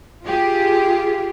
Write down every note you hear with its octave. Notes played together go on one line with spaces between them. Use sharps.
F4 G4 G#4